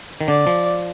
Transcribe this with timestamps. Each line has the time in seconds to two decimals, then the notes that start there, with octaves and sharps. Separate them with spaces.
0.21 D#3
0.28 D3 D5
0.47 F3